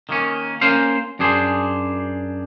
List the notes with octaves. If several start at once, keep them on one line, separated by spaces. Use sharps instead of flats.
D#3 A#3 C#4
A#3 C#4 C5 F5
F#2 D4 G#4 C5